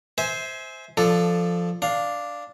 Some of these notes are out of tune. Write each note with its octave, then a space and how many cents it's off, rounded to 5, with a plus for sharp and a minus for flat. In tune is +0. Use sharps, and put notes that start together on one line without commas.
C5 +0 E5 -25 G#5 +10
F3 +0 D4 +5 A4 +0
D4 +0 F5 +0